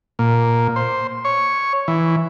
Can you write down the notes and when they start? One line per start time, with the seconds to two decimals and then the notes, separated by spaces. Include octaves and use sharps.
0.19 A#2
0.76 C5
1.25 C#5
1.88 E3